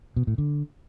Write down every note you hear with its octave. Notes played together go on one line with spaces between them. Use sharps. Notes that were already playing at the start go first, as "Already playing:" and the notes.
B2
A2
D3